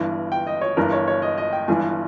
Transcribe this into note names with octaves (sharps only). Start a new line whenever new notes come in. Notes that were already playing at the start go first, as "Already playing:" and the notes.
Already playing: G1 G2 E3
G5
D#5
C#5
G1 G2 E3 A#4
C#5
C#5
D#5
D#5
G5
G1 G2 E3 G#5